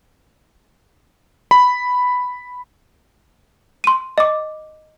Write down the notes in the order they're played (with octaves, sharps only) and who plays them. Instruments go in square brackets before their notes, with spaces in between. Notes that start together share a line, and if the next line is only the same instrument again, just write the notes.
[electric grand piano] B5
[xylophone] C6 D#7
D#5 D6